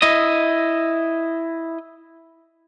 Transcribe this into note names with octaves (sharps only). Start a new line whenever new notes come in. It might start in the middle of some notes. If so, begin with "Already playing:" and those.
E4 D#5